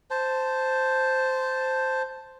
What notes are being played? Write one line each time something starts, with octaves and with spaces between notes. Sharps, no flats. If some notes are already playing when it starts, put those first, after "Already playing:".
C5 A5